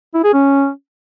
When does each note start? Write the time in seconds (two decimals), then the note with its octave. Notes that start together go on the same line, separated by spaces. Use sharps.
0.15 E4
0.24 G#4
0.34 C#4